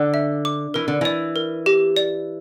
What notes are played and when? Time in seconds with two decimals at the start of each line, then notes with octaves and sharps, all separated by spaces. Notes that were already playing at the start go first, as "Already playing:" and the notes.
Already playing: D3
0.14 E5
0.45 D6
0.74 E3 A#4
0.88 D3
1.01 E3 D5
1.36 A#4
1.66 G4
1.97 D5